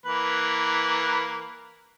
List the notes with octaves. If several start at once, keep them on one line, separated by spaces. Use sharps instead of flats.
E3 A#3 B4